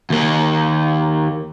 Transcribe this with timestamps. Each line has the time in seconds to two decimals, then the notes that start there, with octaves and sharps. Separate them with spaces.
0.10 D#2 A#3